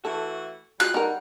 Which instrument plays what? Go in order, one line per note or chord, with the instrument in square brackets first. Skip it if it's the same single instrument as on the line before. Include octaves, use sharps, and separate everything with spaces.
[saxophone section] E3 A3 F#4 [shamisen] A4
[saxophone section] G3 G#3 F4 [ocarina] F#4 [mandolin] F#6
[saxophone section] G3 [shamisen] D#4 A#4 [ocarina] F#5